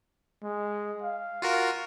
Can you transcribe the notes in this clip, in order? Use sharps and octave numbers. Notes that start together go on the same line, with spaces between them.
G#3
F5
F4 F#4 A#4